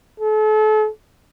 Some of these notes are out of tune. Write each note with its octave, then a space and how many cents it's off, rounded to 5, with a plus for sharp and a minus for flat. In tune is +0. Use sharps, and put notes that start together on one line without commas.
A4 -35